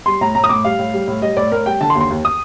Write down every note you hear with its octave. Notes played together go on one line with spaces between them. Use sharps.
G3 C6
A2 A#5
A2 A#5
D#6
A2 D6
G3 F5
A2
G3
A2
G3 D#5
A2 D5
A2 A#4
G3 G5
D3 A5
C6
D#2
C6
D#2
D#6